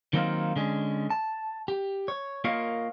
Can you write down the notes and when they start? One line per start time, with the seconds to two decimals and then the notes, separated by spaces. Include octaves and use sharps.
0.13 D#3 F#3 A#3 C4 D#4 F4
0.56 D3 G#3 C#4
1.10 A5
1.68 G4
2.08 C#5
2.44 A#3 F4 A#4 C#5 D#5 F5